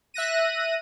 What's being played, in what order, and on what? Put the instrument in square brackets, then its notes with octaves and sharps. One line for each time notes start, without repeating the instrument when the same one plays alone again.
[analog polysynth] E5 F#6 A#6 D#7